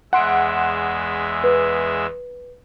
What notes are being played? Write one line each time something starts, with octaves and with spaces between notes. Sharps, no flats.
E2 G#3 E5 F#5 C6 D7
B4